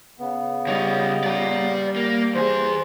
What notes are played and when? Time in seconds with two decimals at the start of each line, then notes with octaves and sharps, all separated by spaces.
0.20 C#3 B3
0.66 C#2 G3 C#5 D#5
1.24 G3 D5 A#5
1.96 A#3
2.35 E2 G#4 C5